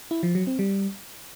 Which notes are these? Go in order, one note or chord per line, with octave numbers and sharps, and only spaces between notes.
E4
F3
F#3
C4
G3